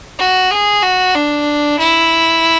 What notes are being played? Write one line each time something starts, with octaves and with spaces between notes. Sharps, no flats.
F#4
G#4
F#4
D4
E4